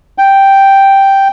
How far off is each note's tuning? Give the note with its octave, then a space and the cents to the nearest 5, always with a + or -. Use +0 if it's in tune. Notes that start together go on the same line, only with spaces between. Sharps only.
G5 +0